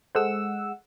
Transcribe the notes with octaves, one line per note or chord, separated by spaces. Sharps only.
G#3 G#4 A4 C5 F#5 E6